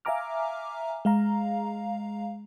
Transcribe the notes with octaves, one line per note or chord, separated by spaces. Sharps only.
E5 F5 G#5 A#5 D6 F6
G#3 F5 A#5